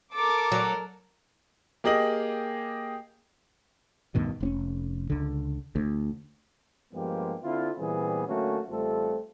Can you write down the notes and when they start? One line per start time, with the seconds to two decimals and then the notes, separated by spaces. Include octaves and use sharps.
0.14 A4 A#4 D6
0.52 F#3
1.84 A#3 G4 G#4 D#5 F#7
4.15 D2 G2 B2 D#3
4.41 F1 C4 C#4
5.10 C#2 D3
5.75 D2
6.93 G2 F3 G#3 A#3 B3 G4
7.43 D3 C4 E4 F4
7.77 A#2 E3 G3 B3 C4 G#4
8.27 D3 F#3 A3 A#3 C#4 F#4
8.68 A1 G3 A3 C4 F4 A4